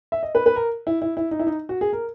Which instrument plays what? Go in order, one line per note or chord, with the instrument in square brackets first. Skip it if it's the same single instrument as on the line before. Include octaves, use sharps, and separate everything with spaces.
[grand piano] E5
D#5
B4
B4
A#4
E4
E4
E4
D#4
E4
D#4
F#4
G#4
A#4